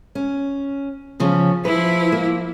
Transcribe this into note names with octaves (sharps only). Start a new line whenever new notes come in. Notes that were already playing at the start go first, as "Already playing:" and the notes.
C#4
C#3 F3 C#4
F3 E4 B4
A#3